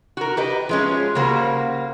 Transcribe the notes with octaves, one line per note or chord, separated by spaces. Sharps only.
F#4 A#4
G4 B4 D#5
F3 G#3 C#4
C#3 G3 A#3 F#4 C5